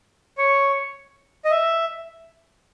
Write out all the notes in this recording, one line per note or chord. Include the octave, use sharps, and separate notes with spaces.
C#5
D#5
E5